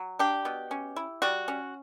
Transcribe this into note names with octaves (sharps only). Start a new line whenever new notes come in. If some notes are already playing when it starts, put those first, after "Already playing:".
Already playing: F#3
D4 G4
B2
C#4
E4
G3 F#4
C#4